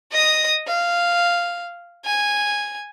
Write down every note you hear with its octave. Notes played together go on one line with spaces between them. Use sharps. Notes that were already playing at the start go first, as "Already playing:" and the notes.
D#5 D#6
F5
G#5